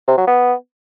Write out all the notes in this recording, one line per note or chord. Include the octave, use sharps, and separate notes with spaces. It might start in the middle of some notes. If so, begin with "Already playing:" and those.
C3
F#3
B3